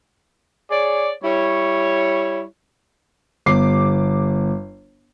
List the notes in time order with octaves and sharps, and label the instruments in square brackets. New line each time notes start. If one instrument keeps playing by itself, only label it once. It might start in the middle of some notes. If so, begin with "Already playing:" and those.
[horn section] G#4 C#5 D5
G3 E4 C#5
[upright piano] G1 D6 C7